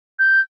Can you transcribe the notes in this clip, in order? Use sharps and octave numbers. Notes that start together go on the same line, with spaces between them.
G6